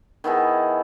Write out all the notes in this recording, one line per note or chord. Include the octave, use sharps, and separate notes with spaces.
D#3 B3 E4 G#4